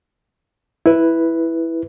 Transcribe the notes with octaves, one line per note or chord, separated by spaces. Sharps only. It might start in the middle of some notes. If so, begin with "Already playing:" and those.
E4 B4